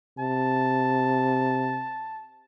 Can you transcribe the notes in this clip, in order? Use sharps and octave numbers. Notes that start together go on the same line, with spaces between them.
C3 A5